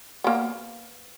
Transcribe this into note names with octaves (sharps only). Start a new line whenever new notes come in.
A#3 B3